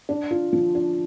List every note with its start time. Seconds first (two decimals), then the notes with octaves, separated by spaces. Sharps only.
0.09 D4
0.31 F4
0.53 F3
0.75 D4